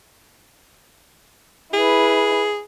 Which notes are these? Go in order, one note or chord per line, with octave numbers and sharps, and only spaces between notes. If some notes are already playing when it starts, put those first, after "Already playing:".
E4 G#4 B4